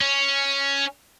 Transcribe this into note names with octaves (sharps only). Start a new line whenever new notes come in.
C#4